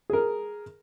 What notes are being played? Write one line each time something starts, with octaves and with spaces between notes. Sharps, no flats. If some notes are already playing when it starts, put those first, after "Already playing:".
G#4 A#4